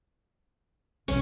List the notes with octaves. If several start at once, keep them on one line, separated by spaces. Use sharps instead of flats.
F1 B1 E3 C#4